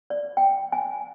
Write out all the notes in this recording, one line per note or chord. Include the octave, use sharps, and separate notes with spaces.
D5
G5
G#5